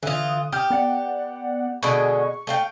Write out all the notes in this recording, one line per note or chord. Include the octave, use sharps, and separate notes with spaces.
D3 E3 F4 D#6
G4 D#6 F6 G6
B3 D5 F#5
B2 D3 G#3 C#6
A3 F5 G5